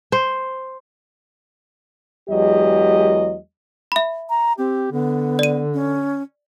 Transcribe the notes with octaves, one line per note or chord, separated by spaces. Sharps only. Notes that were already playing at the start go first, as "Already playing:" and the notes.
C5
E2 F#3 G#3 G4 D#5
E5 B5
A#5
C4 G4
D3 B3
D5 D#7
C#4